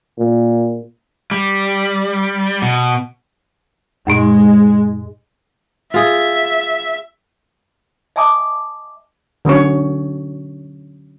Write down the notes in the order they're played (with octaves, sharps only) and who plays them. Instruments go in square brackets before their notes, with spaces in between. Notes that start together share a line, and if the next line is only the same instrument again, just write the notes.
[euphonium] A#2
[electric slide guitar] G3
B2
[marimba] F#2 A#2 D#4 [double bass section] G#3
[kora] F4 G#4 [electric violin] E5
[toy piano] D#5 E5 G#5 A5 D6 D#6
[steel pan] D3 F#3 C#4 C#5